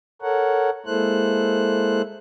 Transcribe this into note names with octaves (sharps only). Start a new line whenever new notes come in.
A4 A#4 C#5 F#5
G#3 A#3 E4 A4 C5 F#6